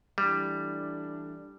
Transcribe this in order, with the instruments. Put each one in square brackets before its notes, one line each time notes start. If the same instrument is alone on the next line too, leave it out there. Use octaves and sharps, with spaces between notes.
[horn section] E3 A3 D4 [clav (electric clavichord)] G3